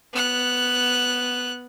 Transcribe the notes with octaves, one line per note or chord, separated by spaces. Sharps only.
B3 F#6